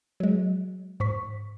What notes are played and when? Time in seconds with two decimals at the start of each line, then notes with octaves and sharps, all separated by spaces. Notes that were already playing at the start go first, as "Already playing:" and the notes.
0.20 F#3 G#3
1.00 G#2 C5 C#6 B6